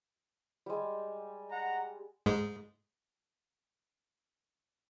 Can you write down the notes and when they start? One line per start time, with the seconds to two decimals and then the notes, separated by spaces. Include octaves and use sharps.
0.66 G3 G#3
1.51 F#5 A#5
2.26 G#2 G#3